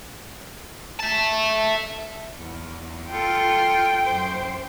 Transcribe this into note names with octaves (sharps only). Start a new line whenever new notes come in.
E5 A5
E2
F4 A4 G5
F#2 C5